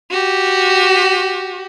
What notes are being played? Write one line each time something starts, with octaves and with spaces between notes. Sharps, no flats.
F#4 G4